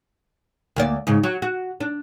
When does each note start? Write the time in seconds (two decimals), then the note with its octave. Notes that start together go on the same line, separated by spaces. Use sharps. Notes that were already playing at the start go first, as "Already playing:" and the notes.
0.76 D2 A#3 D5
1.07 G#2 C#3
1.23 F#3
1.42 F#4
1.80 D4